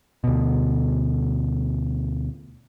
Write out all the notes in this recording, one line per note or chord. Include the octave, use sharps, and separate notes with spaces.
D2 B2